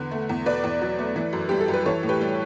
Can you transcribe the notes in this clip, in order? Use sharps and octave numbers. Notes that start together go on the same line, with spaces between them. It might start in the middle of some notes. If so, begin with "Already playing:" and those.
Already playing: E2 D3 B4
A3
E2
B2 B4 D5
E2
F#3
A3
E3
F#2
G3 G4
A4
F#2
B4
E3 A4 C#5
A2
G4 B4
G3